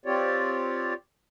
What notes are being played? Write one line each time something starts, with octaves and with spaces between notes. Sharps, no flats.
C4 F4 G4 C#5 D5